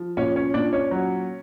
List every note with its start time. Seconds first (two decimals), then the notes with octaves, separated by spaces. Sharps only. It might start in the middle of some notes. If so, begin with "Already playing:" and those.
Already playing: F3
0.17 A#2 C#4 C#5
0.36 C#4 C#5
0.54 A#2 D4 D5
0.73 C#4 C#5
0.91 F#3